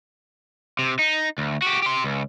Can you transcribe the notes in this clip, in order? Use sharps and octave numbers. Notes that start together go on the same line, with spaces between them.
C3
D#4
D2
F#4 G4
G4 C6
C#2